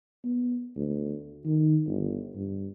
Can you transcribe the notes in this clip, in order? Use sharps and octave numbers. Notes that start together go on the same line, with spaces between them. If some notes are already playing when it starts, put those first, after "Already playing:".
B3
D2
D#3
G1
G2